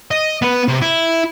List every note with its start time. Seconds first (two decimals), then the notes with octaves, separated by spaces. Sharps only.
0.11 D#5
0.42 B3 B4
0.68 C3
0.82 E4